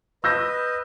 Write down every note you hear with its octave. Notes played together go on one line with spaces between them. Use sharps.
B4 D#5 E6 G6 A#6